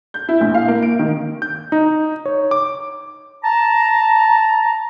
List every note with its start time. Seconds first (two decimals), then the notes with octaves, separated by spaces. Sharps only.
0.14 G6
0.29 E4
0.41 A#1
0.54 F5
0.68 A#3
0.83 D7
0.99 D#3
1.42 G6
1.72 D#4
2.26 C#5
2.51 D6
3.43 A5 A#5